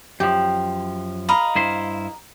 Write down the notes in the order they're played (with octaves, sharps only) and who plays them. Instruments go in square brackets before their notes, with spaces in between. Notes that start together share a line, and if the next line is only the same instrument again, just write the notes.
[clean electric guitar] F#2 F3 [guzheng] G4
[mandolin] A#4 [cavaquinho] D#5 F5 B5
[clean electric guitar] G2 E4 C5